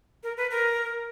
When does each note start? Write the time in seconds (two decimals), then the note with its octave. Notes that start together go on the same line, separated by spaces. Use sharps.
0.23 A#4
0.37 B4
0.51 A#4